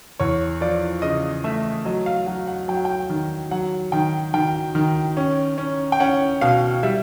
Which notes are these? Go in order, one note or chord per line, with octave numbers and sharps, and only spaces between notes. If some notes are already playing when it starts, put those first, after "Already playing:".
E2 C#5
F3 D5
C#3 D#5
A3 E5
F#3 D#5
F5
F#3 F#5
F#5
F#3 G5
F#5
G5
D#3
F#3 F#5
D#3 G5
D#3 G5
D#3
C#4
C#4
G5
C#4 F#5
B2 F5
G3 E5